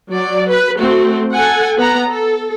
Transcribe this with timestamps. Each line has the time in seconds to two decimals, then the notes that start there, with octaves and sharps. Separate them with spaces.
0.12 F#3 D5
0.49 B4
0.79 A3 C4 F#4
1.32 A4 F#5 G#5
1.77 B3 F#5 A#5
2.08 A4